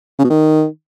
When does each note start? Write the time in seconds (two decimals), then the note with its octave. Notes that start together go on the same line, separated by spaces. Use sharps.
0.19 C#3
0.24 B2
0.30 D#3